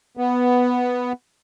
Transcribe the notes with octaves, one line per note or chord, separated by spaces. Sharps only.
B3